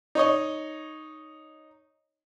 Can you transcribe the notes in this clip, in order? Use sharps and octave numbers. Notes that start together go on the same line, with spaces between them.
D#4 C#5 D#5